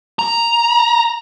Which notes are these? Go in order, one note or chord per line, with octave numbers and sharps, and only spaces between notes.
A#5